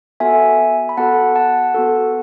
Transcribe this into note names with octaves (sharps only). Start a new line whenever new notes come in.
B3 F#4 A4 E5 G#5
B5
B3 F#4 A4 F#5 A5
F#5 A5
B3 F#4 A4